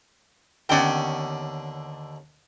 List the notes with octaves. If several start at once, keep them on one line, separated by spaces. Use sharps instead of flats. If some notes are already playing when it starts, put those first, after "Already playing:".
D#2 D3 B3 C#4 D5 G5